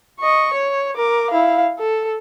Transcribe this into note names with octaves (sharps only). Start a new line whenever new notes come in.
D#5 C#6
C#5
A#4 D6
E4 F5
A4